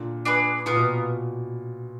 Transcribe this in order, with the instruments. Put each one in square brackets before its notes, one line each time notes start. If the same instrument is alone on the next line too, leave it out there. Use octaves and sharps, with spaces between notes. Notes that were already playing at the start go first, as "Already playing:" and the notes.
Already playing: [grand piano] A#2 D3
[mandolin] D4 G#4 B4
[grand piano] A#2 [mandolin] B3 F4 A#4
[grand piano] B2